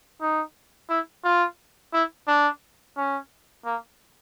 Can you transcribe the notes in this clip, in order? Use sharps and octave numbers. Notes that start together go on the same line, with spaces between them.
D#4
E4
F4
E4
D4
C#4
A#3